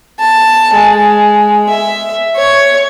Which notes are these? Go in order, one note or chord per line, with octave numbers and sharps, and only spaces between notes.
A5
G#3
E5
C#5